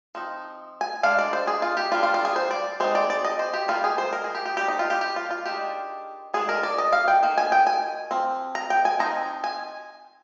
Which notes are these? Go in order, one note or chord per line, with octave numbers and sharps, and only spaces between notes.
F3 C4 D#4
G#5
G#3 D4 F5
D5
C5
G#4
F4
G4
G3 D4 F4
F4
F4
G#4
C5
D5
G#3 C4 D#4 C5
D5
D5
D#5
C5
G4
G3 A#3 D#4 F4
G#4
C5
A#4
G#4
G4
G4
G3 C4 D#4 G4
D#4
F4
G4
G4
F4
F4
D#3 G#3 D4 G4
D#3 G#3 D4 G#4
A#4
D5
D#5
F5
G5
D#3 A#3
G#5
G5
G#5
F3 C4
A#5
G5
G#5
F3 C4 D#4 A#5
G#5